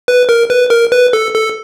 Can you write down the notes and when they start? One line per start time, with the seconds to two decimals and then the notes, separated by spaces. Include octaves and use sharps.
0.08 B4
0.29 A#4
0.50 B4
0.70 A#4
0.92 B4
1.13 A4
1.34 A4